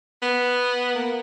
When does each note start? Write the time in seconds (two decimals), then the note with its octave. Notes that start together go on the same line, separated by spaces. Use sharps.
0.23 B3
0.95 A#3